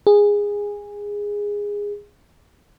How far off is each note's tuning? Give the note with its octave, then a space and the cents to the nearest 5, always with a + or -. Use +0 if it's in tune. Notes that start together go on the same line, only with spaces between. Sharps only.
G#4 -15